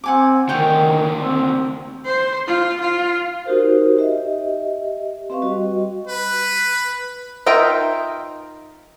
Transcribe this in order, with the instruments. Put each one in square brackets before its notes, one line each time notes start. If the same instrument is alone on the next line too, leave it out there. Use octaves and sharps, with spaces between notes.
[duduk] C4 [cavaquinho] F#5 G#5 D6
[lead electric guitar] D#2 D3 [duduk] D#3 [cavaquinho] C#5 F#5 G5
[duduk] C4
[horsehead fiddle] C5
F4
F4
[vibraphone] D#4 F#4 G4 A#4 C5
G4 D#5 E5
C4 G4 B4 F5 C#6
G3 F#4 D#5
[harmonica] B4
[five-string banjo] D#4 F4 A#4 E5 G5